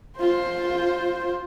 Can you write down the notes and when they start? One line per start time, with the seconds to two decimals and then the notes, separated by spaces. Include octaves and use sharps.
0.18 F4 C5